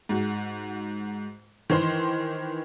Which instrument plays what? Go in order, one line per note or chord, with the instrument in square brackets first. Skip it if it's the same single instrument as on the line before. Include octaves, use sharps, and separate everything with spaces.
[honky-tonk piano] G#2 F#4
D#3 E3 C5 C6